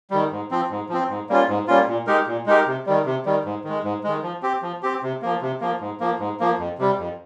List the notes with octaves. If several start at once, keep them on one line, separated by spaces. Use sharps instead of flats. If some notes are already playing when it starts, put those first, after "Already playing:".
D#3 G3
G#2
F3 C4
G#2
F3 C4
G#2
G3 A#3 C#4 F4
G#2
G3 A#3 C#4 F4
A#2
G#3 D#4 G4 A#4
A#2
G#3 D#4 G4 A#4
C3
D#3 G3
C3
D#3 G3
G#2
D#3 G#3
G#2
D#3 G#3
F3
C4 G4
F3
C4 G4
C3
F3 A#3
C3
F3 A#3
G#2
F3 A#3
G#2
F3 A#3
F2
C3 G3
F2